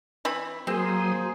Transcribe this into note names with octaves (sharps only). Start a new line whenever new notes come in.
E3 C4 B5
F#3 A#3 C4 G#4 C5 C6 D#6